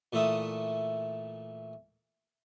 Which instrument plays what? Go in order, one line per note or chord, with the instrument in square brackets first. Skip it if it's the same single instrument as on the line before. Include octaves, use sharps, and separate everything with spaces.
[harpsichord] A#2 E3 A3 E5 D#6